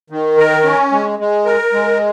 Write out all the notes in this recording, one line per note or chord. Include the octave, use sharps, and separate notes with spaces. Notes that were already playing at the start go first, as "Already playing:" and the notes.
D#3
A#4
C#4
G#3
G#3
A#4
G#3